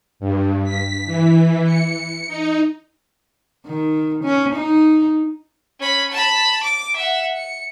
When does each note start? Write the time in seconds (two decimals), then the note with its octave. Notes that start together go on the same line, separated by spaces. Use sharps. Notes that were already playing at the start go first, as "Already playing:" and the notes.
0.20 G2
0.64 B6
1.06 E3
1.66 C#7
2.28 D#4
3.66 D#3
4.24 C#4
4.55 D#4
5.80 C#4 B5
6.12 A5 B5
6.63 D6
6.97 E5 F#5
7.36 C#7